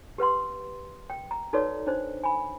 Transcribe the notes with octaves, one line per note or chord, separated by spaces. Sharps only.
G4 B4 F#5 C6
G5
A#5
D#4 F#4 A4 B4 C#5 D5
D4 D#4 C5
G#5 B5